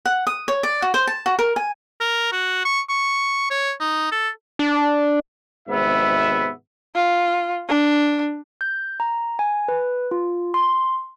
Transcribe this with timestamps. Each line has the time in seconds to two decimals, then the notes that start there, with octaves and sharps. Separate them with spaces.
0.05 F#5
0.27 D#6
0.48 C#5
0.63 D5
0.82 F#4
0.94 C5
1.07 A5
1.26 F#4
1.39 A#4
1.56 G#5
2.01 A#4
2.32 F#4
2.65 C#6
2.89 C#6
3.50 C#5
3.80 D#4
4.12 A4
4.59 D4
5.69 G#1 G#2 C3 B3 E5
6.95 F4
7.68 D4
8.61 G6
9.00 A#5
9.39 G#5
9.68 B4
10.11 F4
10.54 C6